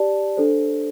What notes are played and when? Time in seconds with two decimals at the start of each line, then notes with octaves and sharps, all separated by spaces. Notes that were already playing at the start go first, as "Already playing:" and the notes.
Already playing: G4 D5 A5
0.37 D4 A4 C5